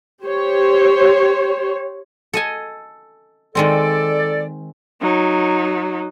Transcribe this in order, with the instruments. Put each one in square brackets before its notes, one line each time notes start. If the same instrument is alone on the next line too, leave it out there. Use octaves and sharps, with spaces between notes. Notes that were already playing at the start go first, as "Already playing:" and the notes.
[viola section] G4 C5 C#5
[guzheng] A4 D#5 G#5
[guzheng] D#3 G#3 C4 [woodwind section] A4 D5
[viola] F#3 D#4